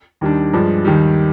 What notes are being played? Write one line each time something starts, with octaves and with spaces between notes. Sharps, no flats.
D#2 D#3 G3 D4
G2 F3 G#3
D#2 D#3 G3